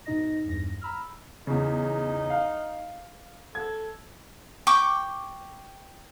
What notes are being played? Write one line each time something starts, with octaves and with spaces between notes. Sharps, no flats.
G#2 B2 D#4 D#5 A#6
E2 G2 A#6
A#5 B5 E6 F6
E2 C#3 D#4
F5
A4 G#6
G5 C#6 D6